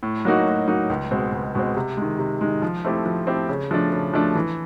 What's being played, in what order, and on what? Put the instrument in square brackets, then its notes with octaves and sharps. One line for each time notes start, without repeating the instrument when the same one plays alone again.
[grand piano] A2
F#3 A#3 D#4 F#4
A2
F#3 A#3 D#4 F#4
C#2
B2 G#3 C4
C#2
B2 G#3 C4
C3
D#3 G#3
C3
D#3 G#3
F3
A3 C4 E4 G4
F3
A3 C4 E4 G4
C#3
F3 A3 D4
C#3
F3 A3 D4
E3